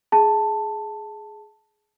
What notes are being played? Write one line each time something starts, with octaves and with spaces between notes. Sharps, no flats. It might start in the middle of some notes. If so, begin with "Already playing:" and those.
G#4 A5